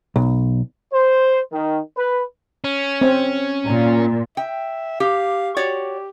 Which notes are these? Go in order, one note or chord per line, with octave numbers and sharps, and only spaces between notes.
B1
C5
D#3
B4
C#4
C4
A#2
E5 G5
G4 F5
F#4 G4 C#5 D5